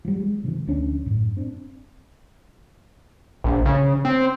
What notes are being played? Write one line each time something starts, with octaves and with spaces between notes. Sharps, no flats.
F3 G3
G#3
C3 D#3 F3
D2 C#4 D4
F#2 A2
C4 D4
A#1
C#3
C4